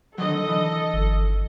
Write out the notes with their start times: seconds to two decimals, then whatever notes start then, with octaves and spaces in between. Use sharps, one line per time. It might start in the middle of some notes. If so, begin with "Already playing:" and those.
0.18 D3 D#3 F#3 A4 D#5
0.48 D3 E3
0.94 G1